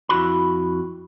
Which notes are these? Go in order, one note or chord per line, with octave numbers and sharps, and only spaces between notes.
F2 E4 F#4 B5